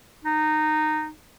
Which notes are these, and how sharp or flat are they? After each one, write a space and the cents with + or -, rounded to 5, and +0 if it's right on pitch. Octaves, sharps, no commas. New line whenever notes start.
D#4 -15